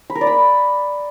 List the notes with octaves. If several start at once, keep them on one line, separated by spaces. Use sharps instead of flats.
B5
A#4
D5
B5